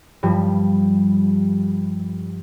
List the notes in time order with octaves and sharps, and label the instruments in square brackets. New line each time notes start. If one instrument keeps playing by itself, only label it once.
[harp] G2 F3 G3